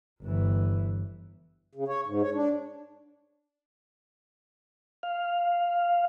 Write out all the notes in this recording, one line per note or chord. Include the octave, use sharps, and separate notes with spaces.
G1 E3
C#3
C#5
G#2
C#5
D4
F5